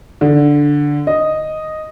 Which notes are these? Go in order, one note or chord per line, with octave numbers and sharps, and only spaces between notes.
D3
D#5